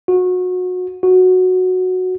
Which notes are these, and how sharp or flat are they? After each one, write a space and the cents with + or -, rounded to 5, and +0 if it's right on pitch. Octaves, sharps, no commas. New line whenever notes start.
F#4 -25
F#4 -5